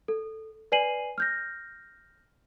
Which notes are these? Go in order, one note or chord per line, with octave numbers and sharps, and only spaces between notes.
A4
B4 D5 G#5 C7 D#7 F#7
F6 G6 A#6